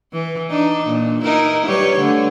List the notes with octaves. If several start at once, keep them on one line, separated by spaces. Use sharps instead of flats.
E3
D4 D#4
A#2
D#4 E4 A#4
G3 B4 C#5
D3 A3